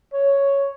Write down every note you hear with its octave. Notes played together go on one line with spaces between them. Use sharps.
C#5